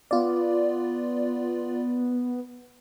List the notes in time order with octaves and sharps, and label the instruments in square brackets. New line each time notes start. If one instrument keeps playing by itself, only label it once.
[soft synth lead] B3 [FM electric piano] F4 D5